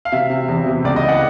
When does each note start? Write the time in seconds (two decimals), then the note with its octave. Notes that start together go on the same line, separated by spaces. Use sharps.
0.05 F5
0.12 C3 E5
0.30 C3
0.48 E2
0.66 C3
0.84 C#2 D5
0.96 D#5
1.03 E3
1.08 F#5